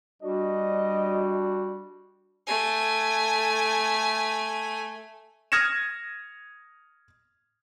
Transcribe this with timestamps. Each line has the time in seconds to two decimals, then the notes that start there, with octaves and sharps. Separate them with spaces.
0.22 G3 D4 F#4 D#5
2.47 A3 G#5
5.52 D#6 F6 G#6 A#6 C#7 E7